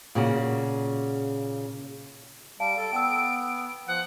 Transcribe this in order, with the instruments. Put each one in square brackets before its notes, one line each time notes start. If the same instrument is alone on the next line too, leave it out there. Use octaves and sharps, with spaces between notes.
[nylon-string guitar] A#2 C#3 F#4
[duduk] G3 [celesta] F5 A5 [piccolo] D7
[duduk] A4
[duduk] B3 [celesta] G5 E6
[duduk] F3 [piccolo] F#5